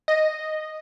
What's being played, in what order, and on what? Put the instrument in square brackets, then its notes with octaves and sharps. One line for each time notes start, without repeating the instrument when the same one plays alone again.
[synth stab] D#5